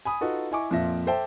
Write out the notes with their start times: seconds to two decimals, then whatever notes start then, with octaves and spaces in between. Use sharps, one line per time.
0.05 G#5 B5 D#6
0.21 D#4 F4 F#4 A4 B4 D#5
0.51 E4 D#5 G#5 C#6 D6
0.71 F2 A#2 F3 E5 A#6
1.07 A4 C5 E5 G5 A5